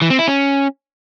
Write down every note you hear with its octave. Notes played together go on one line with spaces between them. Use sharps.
E3
C4
E4
C#4